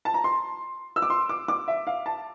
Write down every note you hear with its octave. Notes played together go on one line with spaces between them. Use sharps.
A5
A#5
C6
E6
D6
C6
D6
D6
E5
F5
A5